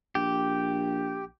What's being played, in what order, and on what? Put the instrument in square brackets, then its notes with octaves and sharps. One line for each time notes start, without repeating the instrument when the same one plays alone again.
[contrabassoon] A#1 [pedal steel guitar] G4